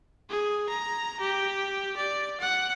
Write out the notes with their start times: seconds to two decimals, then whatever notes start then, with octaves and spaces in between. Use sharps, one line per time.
0.30 G#4
0.69 A#5
1.20 G4
1.97 D5
2.40 F#5